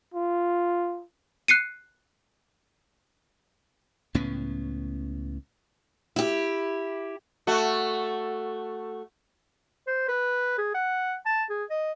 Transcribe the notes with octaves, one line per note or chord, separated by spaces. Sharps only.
F4
F#6 C7 C#7 D#7
C#2 A2 B3 C#4
E4 G4
A3 F#4
C5
B4
G#4
F#5
A5
G#4
D#5